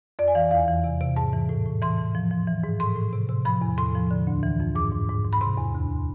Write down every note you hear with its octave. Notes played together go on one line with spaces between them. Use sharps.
F2 D5
G#5
E3 F5
E2 F5
E3
C3
C3
G#2 A5
E3
A2
A2
E3 C6
E3
F3
F3
E3
G#2
A2 C6
A2
C3
C3
F3 B5
E2
A2 C6
F3
D3
D2
E3
F2
G#2 D6
G#2
G#2
G#2
B5
C3 C6
E2
D2